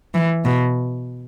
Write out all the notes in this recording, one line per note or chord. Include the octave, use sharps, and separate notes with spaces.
E3
B2